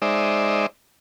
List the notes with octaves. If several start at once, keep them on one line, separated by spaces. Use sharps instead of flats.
G#3 D#4 C5 D5 E5